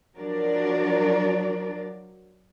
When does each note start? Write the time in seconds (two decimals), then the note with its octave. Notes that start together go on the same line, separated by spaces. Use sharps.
0.15 F3 F#3 D4 A#4 D5